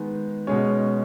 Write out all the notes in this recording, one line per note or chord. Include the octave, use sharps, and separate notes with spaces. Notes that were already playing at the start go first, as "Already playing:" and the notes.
Already playing: D#3 G#3 B3 D#4
B2 G#3 C#4